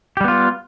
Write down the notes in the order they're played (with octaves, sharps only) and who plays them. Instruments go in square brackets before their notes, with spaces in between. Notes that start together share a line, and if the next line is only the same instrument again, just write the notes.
[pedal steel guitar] G4
G3
B3
F4